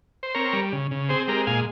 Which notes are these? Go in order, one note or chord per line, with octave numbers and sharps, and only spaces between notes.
C5
C4 A#4 C#5
G3
C#3
C#3
C4 G#4 C5
G#3 G4 A#4
A#2 F5 G#5